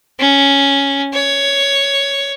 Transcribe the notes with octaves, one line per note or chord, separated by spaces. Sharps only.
C#4
C#5